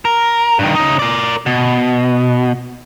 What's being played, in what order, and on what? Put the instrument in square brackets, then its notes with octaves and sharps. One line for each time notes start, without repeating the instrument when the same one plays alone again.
[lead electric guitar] A#4
G2 D#3
C#3 D#4
A#4 D5
B2